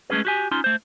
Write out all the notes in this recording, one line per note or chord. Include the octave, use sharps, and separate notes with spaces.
G#3 A3 C#4 G#4 B4
F#4 G4 G#5
C#4 D#4 F4 C6
A3 C5